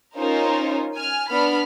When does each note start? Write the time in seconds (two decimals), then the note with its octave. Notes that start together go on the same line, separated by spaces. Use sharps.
0.16 C#4 D#4 F4 A#4 C5
0.95 G#5 F6
1.30 B3 D4 B5 F6